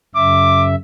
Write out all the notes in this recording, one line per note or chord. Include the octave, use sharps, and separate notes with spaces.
F#2 C#3 E5 D6